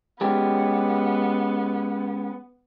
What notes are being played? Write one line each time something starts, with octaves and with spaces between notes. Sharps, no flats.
G#3 B3 C#4 G4